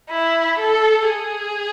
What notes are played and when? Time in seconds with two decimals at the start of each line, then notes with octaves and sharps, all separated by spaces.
0.10 E4
0.60 A4
1.08 G#4